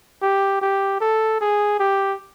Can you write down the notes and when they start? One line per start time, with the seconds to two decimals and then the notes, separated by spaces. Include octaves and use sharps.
0.22 G4
0.62 G4
1.01 A4
1.41 G#4
1.80 G4